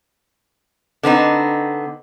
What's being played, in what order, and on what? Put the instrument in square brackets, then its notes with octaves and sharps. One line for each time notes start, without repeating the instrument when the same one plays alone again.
[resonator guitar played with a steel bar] D3 B3 C4 D#4